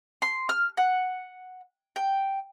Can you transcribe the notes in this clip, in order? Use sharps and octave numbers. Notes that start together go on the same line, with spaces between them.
C6
F6
F#5
G5